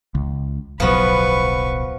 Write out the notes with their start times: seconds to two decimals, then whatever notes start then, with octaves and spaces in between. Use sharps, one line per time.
0.15 C#2
0.80 D1 B1 F3 F#3 B3 B4 C#6